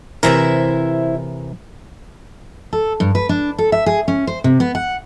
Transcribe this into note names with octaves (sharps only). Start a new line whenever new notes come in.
C3 E3 E4 A#4 C5 E5
A4
G2
B4
D4
A4
E5
G#4
C#4
C5
C3
B3
F#5